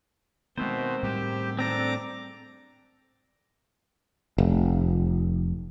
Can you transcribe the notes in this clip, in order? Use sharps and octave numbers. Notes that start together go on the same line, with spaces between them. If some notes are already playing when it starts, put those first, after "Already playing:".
B2 D#3 G#3 B3 C4 C5
A2 G3 G#3 G4
C4 D4 A4 A#5 D6
F1